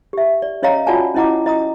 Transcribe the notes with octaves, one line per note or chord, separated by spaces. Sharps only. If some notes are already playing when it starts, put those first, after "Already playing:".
G4 E5
D5
C#4 C#5 D#5 F5 A#5
F4 F#4 D5 F#5 G#5 A5
C#4 E4 D#5 F#5 A#5 D6
D#5 A#5 D#6